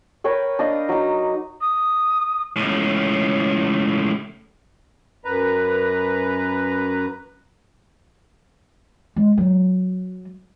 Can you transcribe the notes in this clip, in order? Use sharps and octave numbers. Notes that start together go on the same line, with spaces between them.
A#4 B4 C#5 G5
D4 D#5 F5
F#3 D#4
D#6
C#2 A2
F#2 B4 A#5
G#3
F#3